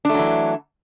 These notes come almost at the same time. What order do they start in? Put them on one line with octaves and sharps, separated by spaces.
D4 A3 F#3 E3